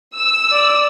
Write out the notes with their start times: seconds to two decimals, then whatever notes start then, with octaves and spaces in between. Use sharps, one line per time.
0.14 E6
0.52 D5